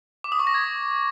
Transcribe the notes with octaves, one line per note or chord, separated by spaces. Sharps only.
D6
D#6
C#6
A#6
G#6